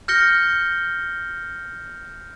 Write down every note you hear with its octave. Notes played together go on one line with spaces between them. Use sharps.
F6 G6 A#6 C#7 G7